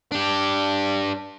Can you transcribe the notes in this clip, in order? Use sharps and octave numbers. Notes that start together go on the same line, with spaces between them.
D4 G4